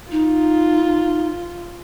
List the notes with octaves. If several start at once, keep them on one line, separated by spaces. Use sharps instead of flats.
D#4 F4